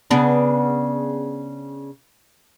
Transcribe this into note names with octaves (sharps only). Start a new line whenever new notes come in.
C#3 B3 D4